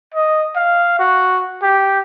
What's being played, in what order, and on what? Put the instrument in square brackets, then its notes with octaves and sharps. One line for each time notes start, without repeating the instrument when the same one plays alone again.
[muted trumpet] D#5
F5
F#4
G4